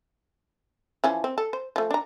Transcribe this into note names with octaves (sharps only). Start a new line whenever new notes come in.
E3 F3 C#4
C4
A4
C5
F3 A3
D4 A#5